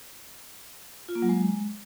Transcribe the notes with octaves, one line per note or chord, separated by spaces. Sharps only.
F4
A#3
F#3
G#3